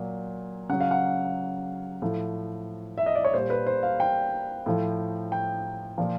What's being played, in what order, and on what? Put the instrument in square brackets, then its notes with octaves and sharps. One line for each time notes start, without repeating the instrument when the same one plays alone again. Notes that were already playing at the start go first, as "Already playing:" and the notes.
Already playing: [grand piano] A#2 F#3
C#3 F#3 F#5
F5
F#5
A2 F3
E5
D#5
D5
C#5
A#2 G3 C5
B4
C5
F5
G5
A2 F3
G5
A#2 F3